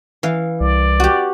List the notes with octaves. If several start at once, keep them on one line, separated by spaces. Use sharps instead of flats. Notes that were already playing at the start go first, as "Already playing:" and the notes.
E3 F5
C2 D5
F#4 G4